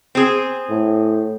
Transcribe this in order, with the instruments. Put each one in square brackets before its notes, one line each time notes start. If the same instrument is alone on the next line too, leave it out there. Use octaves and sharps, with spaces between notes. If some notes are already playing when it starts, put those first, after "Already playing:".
[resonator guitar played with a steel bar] C4 G#4
[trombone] A2